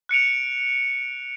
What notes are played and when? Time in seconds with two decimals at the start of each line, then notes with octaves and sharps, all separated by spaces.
0.09 F#6 C#7 D7 F7